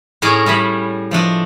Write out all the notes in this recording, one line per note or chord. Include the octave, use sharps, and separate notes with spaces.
A2 A3 C#4 G#4 A#4 D5
A2 G3 A3 B5
F3 A3 D4 D#5